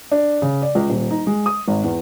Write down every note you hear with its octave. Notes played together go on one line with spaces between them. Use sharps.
D4
C#3
D5
C#2
D#1
D#4
G#3
D#6
G#1
E2